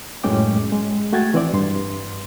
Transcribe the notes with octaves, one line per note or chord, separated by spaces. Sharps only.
F#2 A2 G#3 C#4 G5 D6
G#3
A3 F#4 G5 G#6 A6
E3 C4 C5 D5
G2 C6